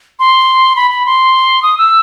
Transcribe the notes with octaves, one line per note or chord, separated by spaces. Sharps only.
C6
B5
B5
C6
D#6
E6